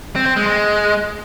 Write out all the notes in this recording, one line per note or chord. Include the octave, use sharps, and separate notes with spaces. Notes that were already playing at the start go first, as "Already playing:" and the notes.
C4
C4
G#3
G#3